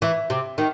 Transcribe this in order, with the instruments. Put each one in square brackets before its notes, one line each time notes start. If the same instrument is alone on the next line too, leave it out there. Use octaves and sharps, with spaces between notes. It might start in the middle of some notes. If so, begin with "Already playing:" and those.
[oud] E3 [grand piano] E5
[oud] C3
D#3